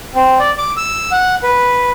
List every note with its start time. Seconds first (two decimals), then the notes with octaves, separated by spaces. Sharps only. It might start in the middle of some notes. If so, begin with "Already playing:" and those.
0.15 C4
0.39 D5
0.58 D6
0.77 E6
1.12 F#5
1.43 B4